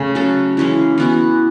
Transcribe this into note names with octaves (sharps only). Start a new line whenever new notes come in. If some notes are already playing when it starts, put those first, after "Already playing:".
Already playing: C#3 A3
F#3 C#4 F#4 A4
E3 G#3 C#4 E4
E3 B3 F#4